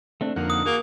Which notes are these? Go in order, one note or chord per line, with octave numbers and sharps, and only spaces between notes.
A3 C4 D4
F2 D3 A#3 D#4 A#4 F#5
D#6
A#3 F#4 G#4